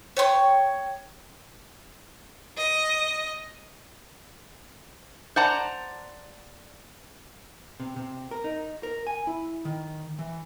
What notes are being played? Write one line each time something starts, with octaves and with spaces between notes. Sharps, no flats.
C#5 G5 C6 C#6
D#5
C5 D5 F#5 A5 A#5
C3
C3
A#4
D#4
A#4
G#5
E4
D#3
E3